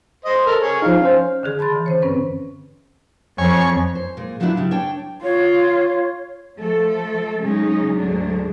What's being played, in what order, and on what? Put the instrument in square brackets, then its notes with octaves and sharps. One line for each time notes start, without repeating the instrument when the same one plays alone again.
[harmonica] C5 D#5
A4 A#4
G#4 C#5
[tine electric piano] F3 D#4 [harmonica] F5
[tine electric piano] C#4 C5
[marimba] D3 D#3 G#4
A5 B5 C6 A6
D3 E3
C#4 C5 C#5
G2 C4 C#4 B4
[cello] F2 [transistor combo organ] C#5 G#5
[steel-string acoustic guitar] C5
A#2 G#3
F3 F#3 A3 B3 D4 E4
C#3 G3
D4 C#5 G5
[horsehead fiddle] F4 [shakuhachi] C#5
[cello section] F3 A3 A4
C#3 F#3 G#3 C#4 D#4
D2 G#2 F#3 G#3 D4